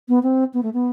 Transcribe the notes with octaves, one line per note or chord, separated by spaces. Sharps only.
B3
C4
B3
A3
B3